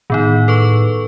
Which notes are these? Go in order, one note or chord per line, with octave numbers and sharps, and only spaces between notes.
A2 D#3 B3 D#4
A4 B4 C#6